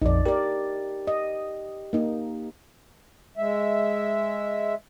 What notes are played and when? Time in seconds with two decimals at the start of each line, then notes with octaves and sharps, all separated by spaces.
0.02 A#1 F2 D#4 D5
0.26 G4 A#4 D5
1.07 D#5
1.93 A#3 D#4
3.38 G#3 E5